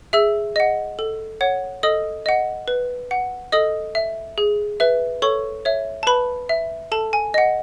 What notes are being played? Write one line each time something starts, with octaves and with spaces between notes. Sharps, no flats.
G#4 E5 E6
D#5 F#5
A4
C#5 F#5
A4 D#5 D#6
D#5 F#5
B4
F#5
A4 D#5 D#6
E5
G#4
B4 E5
A4 C#5 C#6
C#5 E5
A5
B4 B5
E5
A4 A5
G#5
D#5 F#5